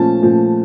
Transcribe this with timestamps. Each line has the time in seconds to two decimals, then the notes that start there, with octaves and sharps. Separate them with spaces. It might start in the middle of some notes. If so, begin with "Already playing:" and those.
Already playing: A#2 F3 A3 C#4 A5
0.20 A#2 F3 A3 C#4